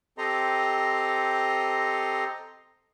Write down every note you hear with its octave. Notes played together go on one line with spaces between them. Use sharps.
C4 G4 A4 D#5 A#5 C6